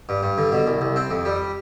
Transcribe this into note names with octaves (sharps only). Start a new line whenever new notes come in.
G2
G2
D3
B2
C2
C2
C4
F2
G3